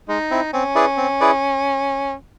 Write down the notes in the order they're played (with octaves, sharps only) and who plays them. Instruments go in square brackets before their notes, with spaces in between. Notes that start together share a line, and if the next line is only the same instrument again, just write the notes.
[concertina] G#3 [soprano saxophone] D#4
[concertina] C4 E4
[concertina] C4 [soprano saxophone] C#4
[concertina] E4 G#4 B4 D5
C4
E4 G#4 B4 D5